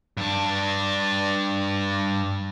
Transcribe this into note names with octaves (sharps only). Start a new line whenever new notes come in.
G2 D4